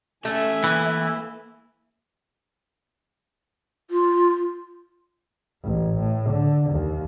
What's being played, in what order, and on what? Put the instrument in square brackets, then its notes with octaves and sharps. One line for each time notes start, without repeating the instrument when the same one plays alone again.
[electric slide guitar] A2 C#4 A5 [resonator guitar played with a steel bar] A3 [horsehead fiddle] E5 G#5
[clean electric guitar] E3 [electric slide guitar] A#3 B4
[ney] F4
[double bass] A1
A2
D3
D#2